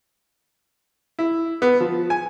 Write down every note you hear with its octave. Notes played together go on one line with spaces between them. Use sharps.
E4
B3
F3
G#5